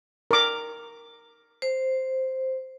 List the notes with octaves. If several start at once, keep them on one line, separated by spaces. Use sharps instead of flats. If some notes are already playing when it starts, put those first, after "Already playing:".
A#4 D6
C5